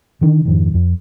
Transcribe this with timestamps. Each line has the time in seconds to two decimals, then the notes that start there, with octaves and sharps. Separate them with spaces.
0.21 D3 D#3 D4
0.45 F2 G#2 D#3
0.74 F2